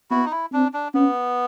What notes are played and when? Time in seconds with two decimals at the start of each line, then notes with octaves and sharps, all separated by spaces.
0.11 B3 E4 F#4
0.25 D#4
0.31 E4
0.53 C4 D4
0.74 D4
0.94 B3 C#4